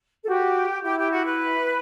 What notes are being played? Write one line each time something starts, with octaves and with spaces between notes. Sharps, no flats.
A4
F#4 G4
E4 G4
G4
F#4
B4